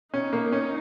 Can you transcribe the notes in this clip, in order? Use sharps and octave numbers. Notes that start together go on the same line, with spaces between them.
C#4 D#4
A#3
C#4